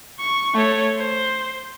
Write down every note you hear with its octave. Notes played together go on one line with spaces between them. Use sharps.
C#6
A3 C#5
C5